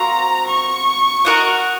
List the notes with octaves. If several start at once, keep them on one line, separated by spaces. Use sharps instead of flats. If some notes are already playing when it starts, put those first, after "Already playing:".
Already playing: C4 F#4 A#4 F5 A#5
C#6
F#4 A#4 D#5 F#5